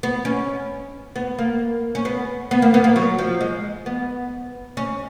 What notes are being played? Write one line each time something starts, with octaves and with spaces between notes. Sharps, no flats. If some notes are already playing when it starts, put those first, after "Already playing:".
B3
C#4
B3
A#3
C#4
B3
B3
A#3
B3
A#3
F#3
F3
G#3
B3
C#4